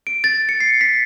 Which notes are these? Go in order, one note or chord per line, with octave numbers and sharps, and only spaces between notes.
D7
A6
C#7
C7
B6